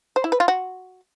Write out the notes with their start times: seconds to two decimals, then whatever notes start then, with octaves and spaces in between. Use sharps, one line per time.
0.16 C5
0.24 E4
0.32 B4
0.40 F4
0.48 F#4